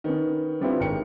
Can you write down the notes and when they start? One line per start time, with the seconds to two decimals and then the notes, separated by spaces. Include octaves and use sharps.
0.04 D#3 B3 C#4
0.60 D3 G3 B3 C4 E4 F4
0.80 G#1 A#4 G5 C#7